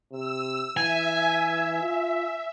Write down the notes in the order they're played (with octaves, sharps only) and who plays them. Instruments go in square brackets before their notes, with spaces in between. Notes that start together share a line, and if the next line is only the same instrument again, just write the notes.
[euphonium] C3 [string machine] E6
[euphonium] E3 [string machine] E5 [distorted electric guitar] G#5
[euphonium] F4